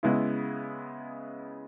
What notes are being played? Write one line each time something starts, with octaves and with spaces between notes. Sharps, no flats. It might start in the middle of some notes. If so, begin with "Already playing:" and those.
C#3 G#3 B3 E4